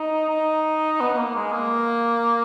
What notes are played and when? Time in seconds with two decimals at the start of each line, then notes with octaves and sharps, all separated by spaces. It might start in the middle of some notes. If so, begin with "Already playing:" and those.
Already playing: D#4
0.29 D#4
1.01 B3
1.13 B3
1.17 A#3
1.35 G#3
1.53 A#3